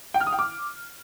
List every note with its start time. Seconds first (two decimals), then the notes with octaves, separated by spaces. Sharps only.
0.14 G5
0.20 F6
0.27 D#6
0.33 G5
0.39 D6